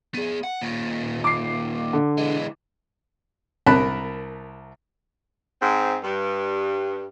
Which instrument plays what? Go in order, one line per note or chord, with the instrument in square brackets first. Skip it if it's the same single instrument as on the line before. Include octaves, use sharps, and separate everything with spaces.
[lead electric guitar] B3 G#4
F#5
D#2 A#2
[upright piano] D6 C7
D3
[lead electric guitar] E3 G#3
[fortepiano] C2 A#4 A5 B5 F#6
[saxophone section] G#2 C4
G2